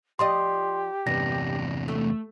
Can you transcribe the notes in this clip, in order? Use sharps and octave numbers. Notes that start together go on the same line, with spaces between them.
F3 G4 D5 D#5 C6
E2 G2 C3 A#6
A3